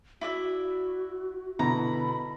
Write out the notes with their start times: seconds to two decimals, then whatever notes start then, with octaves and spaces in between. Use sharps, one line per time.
0.21 E4 F#4 D5 E5
1.59 B2 D3 E4 A#5 B5